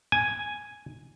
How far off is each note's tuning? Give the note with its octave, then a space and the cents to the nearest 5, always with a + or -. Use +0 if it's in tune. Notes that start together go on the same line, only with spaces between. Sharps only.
G#5 +0